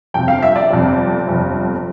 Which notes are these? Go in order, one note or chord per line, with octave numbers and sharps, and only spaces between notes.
G1 F2 C3 G5
F5
E5
D5
G1 F2 C3
G1 F2 C3